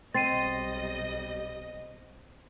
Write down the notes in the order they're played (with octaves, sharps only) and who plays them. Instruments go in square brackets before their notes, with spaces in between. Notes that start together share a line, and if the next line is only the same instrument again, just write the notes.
[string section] B1 G3 D#5 [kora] C4 [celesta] A6 C7 D#7